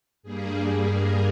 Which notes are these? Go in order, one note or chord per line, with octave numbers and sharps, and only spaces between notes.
G2 G3 A#3 G#4
A#4